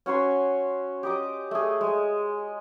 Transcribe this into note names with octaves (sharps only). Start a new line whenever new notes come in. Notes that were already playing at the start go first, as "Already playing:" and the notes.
C#4 F#4 C#5 C6
G4 D#5 D6
A3 G#4
G#3